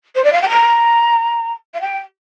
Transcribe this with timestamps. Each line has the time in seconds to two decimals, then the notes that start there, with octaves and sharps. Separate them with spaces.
0.15 C5
0.24 D5
0.32 F5
0.42 G5
0.49 A#5
1.74 F5
1.81 G5